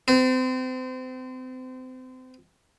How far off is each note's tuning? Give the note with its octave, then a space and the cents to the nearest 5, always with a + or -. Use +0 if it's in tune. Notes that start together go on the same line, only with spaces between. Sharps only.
C4 -30